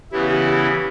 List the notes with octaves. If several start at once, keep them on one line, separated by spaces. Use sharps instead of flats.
C#3 E3 B3 E4 G4
G4